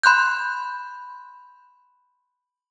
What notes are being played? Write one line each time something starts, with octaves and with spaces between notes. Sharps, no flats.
B5 C6 F#6 G6